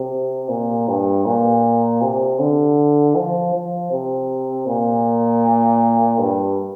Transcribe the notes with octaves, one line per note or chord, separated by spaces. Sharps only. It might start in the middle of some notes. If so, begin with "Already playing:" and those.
Already playing: C3
A#2
G2
A#2
C3
D3
F3
F3
C3
A#2
G2